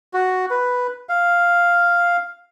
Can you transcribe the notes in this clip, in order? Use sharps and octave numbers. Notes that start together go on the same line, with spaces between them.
F#4
B4
F5